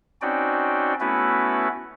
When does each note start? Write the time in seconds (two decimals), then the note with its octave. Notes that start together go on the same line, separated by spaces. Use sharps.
0.22 C4 C#4 D#4 F#4 D5 G5
1.00 A3 B3 C#4 E4 F#4 B4